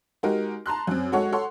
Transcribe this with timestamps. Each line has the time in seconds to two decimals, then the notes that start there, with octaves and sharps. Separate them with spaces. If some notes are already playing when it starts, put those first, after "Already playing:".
0.23 G#3 D#4 F#4 G4 A#4
0.66 A5 A#5 C6 F#6
0.87 F#2 C4
1.12 G#3 F#4 A4 C#5 F#5
1.32 A4 C#5 F#5 C6